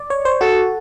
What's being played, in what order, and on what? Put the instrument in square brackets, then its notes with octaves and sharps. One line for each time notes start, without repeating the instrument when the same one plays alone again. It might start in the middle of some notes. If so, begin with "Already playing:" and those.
Already playing: [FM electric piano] D5
C#5
C5
[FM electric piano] F#4 [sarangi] A4